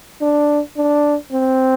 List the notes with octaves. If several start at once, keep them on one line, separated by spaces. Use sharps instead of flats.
D4
D4
C4